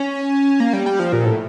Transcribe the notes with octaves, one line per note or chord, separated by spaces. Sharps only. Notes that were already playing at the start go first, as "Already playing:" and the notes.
Already playing: C#4
A#3
G3
G3
F3
A#2
A2